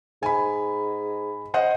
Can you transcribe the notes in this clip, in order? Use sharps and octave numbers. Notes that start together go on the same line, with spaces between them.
G#2 G#5 B5
C5 D#5 F#5